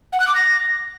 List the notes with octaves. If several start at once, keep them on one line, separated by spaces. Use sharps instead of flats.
F#5
F#6
D6
A#6